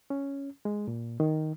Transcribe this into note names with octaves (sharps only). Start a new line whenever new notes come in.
C#4
G#3
A#2
D#3